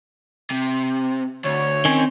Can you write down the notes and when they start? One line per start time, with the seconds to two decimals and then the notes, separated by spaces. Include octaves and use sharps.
0.51 C3
1.45 D2 C#5
1.85 D#3 C4 C#4